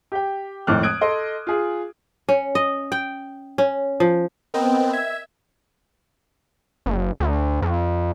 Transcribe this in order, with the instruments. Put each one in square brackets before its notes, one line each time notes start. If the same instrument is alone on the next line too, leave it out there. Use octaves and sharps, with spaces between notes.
[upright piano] G4 G5
G#1 F2 A2 D6 F6 F#6
D#6 F#6 G#6 D7
A4 D#5 C6
F4 G#4
[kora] C#4
D#5
G5
C#4
F3
[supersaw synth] B3 C4 [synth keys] A#4 D#5 G5
[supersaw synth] E5 [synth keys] G#6
[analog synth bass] F#1
D2
F2